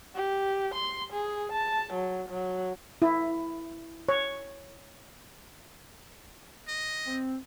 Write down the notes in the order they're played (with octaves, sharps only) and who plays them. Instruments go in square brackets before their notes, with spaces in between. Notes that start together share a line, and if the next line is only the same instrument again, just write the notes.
[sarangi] G4
C6
G#4
A5
F#3
F#3
[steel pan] E4
C#5
[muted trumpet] D#5
[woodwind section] C4